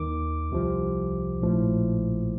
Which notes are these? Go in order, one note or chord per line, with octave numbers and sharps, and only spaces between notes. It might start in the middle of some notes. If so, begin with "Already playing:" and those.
Already playing: D#2 D#3 D6
C2 C3 F3
A#1 A2 F3